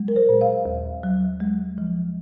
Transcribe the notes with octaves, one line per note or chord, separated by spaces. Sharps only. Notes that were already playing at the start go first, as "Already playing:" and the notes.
Already playing: F#3 G#3
A#4
C5
A#2
F5
D#2
F#3
G#3
F3